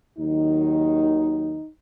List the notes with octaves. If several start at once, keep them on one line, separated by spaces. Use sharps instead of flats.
D#2 D#3 F#3 D#4